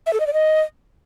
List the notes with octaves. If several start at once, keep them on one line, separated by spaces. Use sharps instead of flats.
E5
A4
D#5
D5
D#5